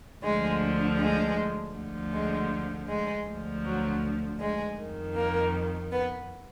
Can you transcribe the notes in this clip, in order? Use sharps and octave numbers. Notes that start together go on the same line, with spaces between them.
D2 D3 F3 G#3
G#3
D2 D3 F3
G#3
G#3
D2 D3 F3
F#3
G#3
F2 D#3
A#3
B3